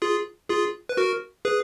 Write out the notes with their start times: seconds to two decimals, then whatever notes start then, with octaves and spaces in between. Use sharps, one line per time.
0.02 F4 G#4
0.49 F4 G#4
0.89 B4
0.97 F#4 A#4
1.45 G#4 B4